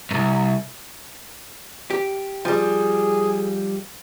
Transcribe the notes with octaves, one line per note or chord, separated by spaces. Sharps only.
C2 F#2
G4
F3 G3 G#4